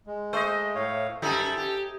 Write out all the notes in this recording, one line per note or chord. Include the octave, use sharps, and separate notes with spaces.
G#3
A3 C5 D#5
A2 C#5 F5
F#2 G3 D#4 E4 A4 G#5
G4